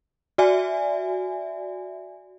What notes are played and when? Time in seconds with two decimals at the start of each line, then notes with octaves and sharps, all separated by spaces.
0.38 F#4 D5 E5 G#5